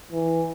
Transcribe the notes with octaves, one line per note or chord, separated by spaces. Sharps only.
E3